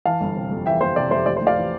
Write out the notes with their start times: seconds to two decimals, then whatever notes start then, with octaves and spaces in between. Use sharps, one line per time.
0.05 E3 F5 A5
0.21 G1
0.36 C3
0.51 F2
0.66 E3 E5 G5
0.81 G1 C5 E5
0.96 C3 D5
1.11 F2 C5 E5
1.26 A1 D5
1.37 C5
1.41 A1
1.47 D5 F5
1.57 E3